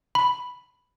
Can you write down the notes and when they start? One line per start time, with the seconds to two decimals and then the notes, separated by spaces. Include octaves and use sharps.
0.15 B5